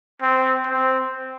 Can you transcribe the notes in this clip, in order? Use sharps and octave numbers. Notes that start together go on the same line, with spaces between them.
C4
C4